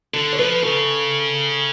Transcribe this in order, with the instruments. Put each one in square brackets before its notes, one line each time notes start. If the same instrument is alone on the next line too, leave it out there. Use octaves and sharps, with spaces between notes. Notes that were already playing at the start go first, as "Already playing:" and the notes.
[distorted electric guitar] D3 [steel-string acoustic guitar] A4
[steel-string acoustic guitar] C#5
[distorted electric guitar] F3 [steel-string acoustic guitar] B4
[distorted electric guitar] C#3 [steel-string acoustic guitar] A4